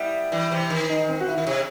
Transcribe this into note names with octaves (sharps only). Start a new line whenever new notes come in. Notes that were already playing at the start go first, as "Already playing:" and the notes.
Already playing: G3 B3 E4
E3 G3
C3 E3
D#3
D#4
C4
F#4
E4
D#3
C3